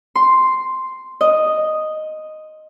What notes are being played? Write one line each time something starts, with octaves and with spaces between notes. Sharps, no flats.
C6
D#5